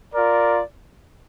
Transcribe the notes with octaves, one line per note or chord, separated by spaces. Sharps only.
F4 A#4 D5